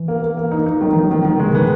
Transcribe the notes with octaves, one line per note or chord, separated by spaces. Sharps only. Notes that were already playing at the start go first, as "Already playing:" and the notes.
Already playing: E3
A#3
A#3
A#3
D#4
D#4
D#3 F#3
D#3 E3
F#3
D#3 E3
D#3 E3
C#3 G#3
B2
D#3 B3